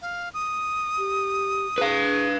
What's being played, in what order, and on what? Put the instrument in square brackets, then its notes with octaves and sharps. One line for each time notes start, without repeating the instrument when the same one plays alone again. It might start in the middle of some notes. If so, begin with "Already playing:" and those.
[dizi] F5
D#6
[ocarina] G4
[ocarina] G#4 [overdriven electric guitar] B4 F5